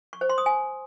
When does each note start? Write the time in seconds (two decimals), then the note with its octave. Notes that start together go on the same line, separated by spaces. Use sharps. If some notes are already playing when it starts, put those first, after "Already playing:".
0.13 C#6
0.21 C5
0.29 C6
0.38 D#6
0.46 G#5